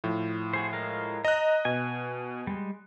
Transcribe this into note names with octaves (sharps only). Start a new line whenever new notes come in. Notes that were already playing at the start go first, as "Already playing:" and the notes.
A2 F3
F#4 G#4 C5
G#3 A#4 F5
D#5 A#5 F#6
B2 G#5
G3 G#3